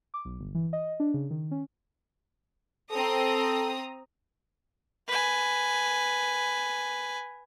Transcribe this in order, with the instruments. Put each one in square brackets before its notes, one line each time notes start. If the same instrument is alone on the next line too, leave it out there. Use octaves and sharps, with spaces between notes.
[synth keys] D6
B1
G1
E3
D#5
D4
C#3
D#3
C#4
[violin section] C4 A#5 D#6 [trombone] A4
[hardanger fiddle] B4 G#5